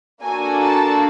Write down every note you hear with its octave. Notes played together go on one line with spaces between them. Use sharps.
A#3 D4 F#4 A4 G#5
A5